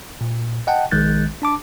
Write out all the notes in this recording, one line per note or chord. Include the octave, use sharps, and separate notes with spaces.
A#2
D#5 F#5 G5 A5
A#1 D#3 G#3 F#6 G6 A6
D4 A5 D6